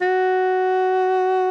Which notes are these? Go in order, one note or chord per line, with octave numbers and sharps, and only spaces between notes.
F#4